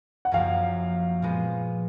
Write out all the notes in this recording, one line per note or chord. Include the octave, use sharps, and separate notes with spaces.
F#5
F#1 F#2 F3 A#3 F5
A#2 F3 G#3 B3